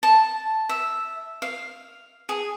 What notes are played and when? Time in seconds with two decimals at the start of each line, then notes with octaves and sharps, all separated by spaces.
0.03 A5
0.69 E5
1.42 F5
2.29 G#4